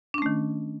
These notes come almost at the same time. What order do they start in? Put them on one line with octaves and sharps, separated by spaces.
D4 C#4 A3 D#3